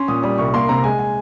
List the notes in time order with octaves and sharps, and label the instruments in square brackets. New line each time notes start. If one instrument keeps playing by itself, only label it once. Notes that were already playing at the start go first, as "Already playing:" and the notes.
Already playing: [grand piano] C#4 C6
A#2 D#6
G3 D#6
C2 C#6
A#3 C6
C3 A#5
G#3 G#5
G#5